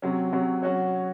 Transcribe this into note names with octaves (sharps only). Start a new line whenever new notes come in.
C3 F#3 C#4
C3 F#3 C#4
F#3 C#4 F#4 C#5